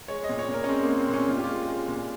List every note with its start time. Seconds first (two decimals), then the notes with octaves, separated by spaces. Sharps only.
0.08 G#3 C#5
0.24 D#5
0.29 A#2
0.39 C#5
0.48 A#2
0.54 A#4
0.64 C#4
0.68 G#3 C4
0.83 G#3 A#3
0.99 C4
1.09 A#2 C#4
1.28 A#2 F4
1.37 G4
1.44 G#3 F4
1.68 G#3
1.88 A#2